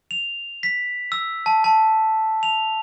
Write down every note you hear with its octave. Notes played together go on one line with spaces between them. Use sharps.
F7
B6
E6
A5
A5
F7